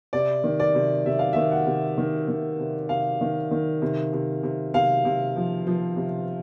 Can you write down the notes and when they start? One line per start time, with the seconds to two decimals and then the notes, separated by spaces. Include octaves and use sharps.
0.13 C3 D5
0.44 D#3
0.60 D5
0.75 C3
1.06 C3 E5
1.19 F5
1.33 D#3 E5
1.51 F#5
1.66 C3
1.98 D#3
2.28 D#3
2.59 C3
2.89 C3 F5
3.21 D#3
3.51 D#3
3.82 C3
4.13 C3
4.43 C3
4.74 C3 F5
5.05 C3
5.36 F3
5.67 F3
5.96 C3